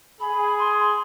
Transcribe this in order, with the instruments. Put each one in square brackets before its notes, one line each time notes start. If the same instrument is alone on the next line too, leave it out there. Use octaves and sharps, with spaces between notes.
[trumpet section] G#4 [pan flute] B5
[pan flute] C6
C6